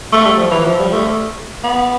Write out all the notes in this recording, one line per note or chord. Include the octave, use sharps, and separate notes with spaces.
A3
G3
F3
E3
F3
G3
A3
B3